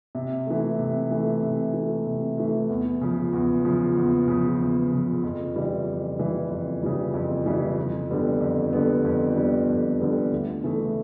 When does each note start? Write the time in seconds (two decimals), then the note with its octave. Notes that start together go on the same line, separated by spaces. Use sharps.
0.15 C3
0.47 E3 A3
0.79 C3
1.11 E3 A3
1.43 C3
1.74 E3 A3
2.06 C3
2.38 E3 A3
2.69 E2
3.01 C#3 F3
3.33 E2
3.65 C#3 F3
3.97 E2
4.28 C#3 F3
4.60 E2
4.91 C#3 F3
5.23 F2
5.56 C#3 E3 G3
5.87 F2
6.19 C#3 E3 G3
6.50 F2
6.83 C#3 E3 G3
7.14 F2
7.46 C#3 E3 G3
7.78 F2
8.10 D3 G3 B3
8.41 F2
8.73 D3 G3 B3
9.05 F2
9.36 D3 G3 B3
9.68 F2
10.00 D3 G3 B3
10.32 D2
10.64 C#3 E3 A3